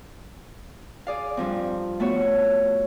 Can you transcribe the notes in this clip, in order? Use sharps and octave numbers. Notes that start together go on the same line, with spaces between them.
G#4 D5 F5
G2 F3 C4
A3 B3 F#4 C#5